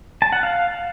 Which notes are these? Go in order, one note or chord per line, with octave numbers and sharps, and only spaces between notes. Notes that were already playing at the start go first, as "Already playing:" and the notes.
A5
F#5
F5